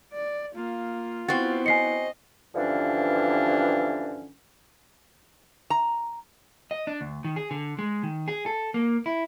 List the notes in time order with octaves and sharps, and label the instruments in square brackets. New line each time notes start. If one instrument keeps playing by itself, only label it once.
[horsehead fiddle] D5
[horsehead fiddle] A#3 [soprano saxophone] F4
[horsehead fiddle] B3 E4 [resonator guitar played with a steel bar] C4 F#4 [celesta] A6
[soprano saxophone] D#5 [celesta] G#5 C7 C#7
[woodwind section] G2 D3 E3 F3 C#4 D4
[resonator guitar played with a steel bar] A#5
[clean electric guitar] D#5
D4
D2
D#3
G#4
D3
G#3
D#3
G#4
A4
A#3
E4